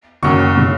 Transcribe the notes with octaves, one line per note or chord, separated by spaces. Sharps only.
F#1 F#2 D#3 C#6
C#3